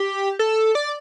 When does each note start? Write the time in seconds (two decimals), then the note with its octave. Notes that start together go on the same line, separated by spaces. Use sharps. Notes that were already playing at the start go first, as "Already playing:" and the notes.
Already playing: G4
0.39 A4
0.75 D5